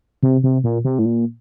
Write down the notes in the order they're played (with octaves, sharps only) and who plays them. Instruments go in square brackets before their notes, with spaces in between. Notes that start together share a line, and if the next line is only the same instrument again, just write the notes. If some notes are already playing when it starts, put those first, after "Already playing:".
[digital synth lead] C3
C3
A#2
C3
A2
A#2